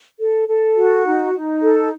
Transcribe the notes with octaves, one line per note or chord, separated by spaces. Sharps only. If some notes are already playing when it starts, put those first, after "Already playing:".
A4
A4
F#4
D#4
D#4
A4